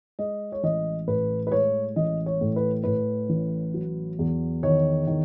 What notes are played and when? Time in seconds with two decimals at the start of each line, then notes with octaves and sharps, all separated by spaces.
0.19 G#3 D#5
0.52 C#5
0.63 A1 D#5
1.08 A2 B4
1.47 B4
1.52 G#3 C#5
1.96 A1 D#5
2.26 C#5
2.41 A2
2.56 B4
2.84 A2 B4
3.30 A1
3.74 F#3
4.19 E2
4.63 D#3 C#5
5.07 D#3